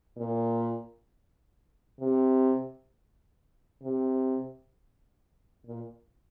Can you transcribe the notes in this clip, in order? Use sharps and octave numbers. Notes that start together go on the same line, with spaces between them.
A#2
C3
C3
A#2